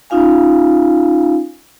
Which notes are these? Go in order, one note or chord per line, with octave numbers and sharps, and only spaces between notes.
C#4 D#4 F4 F5 G#5